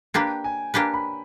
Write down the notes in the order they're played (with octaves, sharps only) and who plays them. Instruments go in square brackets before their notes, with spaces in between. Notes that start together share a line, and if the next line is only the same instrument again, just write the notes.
[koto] A#3 D4 G4 B4 [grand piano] G5
[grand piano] G#5
[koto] A#3 D4 G4 B4
[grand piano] B5